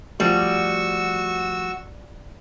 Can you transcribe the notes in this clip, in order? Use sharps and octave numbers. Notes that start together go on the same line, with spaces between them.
F3 G3 A3 F#4 C#6 E6